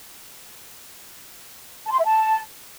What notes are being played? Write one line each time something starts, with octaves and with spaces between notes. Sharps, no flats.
A5
C6
E5
A5